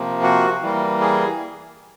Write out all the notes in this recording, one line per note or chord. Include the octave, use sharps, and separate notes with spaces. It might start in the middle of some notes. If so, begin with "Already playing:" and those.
Already playing: C3 F3 A#3
F#4
E3 G3 A#3
G#4